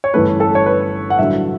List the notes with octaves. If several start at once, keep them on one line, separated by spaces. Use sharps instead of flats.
C#5
G1 G2 E3 A3 C#4 B4
A4
C#5
B4
F#5
A1 G2 D3 F#3 E5